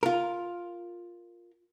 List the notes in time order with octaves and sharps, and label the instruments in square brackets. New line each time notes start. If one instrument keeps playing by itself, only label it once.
[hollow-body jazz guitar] F4 A#4